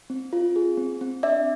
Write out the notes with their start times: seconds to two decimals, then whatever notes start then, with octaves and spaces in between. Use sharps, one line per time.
0.10 C4
0.33 F4
0.56 G#4
0.78 C4
1.01 C4
1.23 D4 D5 E5